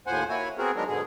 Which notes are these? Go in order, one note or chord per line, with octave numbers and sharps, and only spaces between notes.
D#2 A2 F3 C5 F#5 G#5
A#3 E4 F#4 C#5 G#5
B3 C4 F#4 G#4 A#4
D#3 F#3 G#3 B3 D4 A#4
G#2 B2 D3 G#4